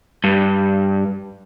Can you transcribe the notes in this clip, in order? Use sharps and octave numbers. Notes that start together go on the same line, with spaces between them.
G2